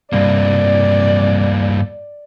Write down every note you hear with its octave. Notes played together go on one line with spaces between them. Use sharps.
C2 G2 A#3 D5